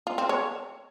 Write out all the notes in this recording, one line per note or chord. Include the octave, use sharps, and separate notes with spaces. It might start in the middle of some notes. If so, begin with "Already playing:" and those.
F4
C4
C#5